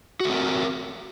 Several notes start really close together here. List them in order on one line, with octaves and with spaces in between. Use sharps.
F#4 A3 C4 A#4